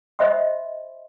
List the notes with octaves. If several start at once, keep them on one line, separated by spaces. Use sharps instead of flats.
C5 D#5 E5 B5 C6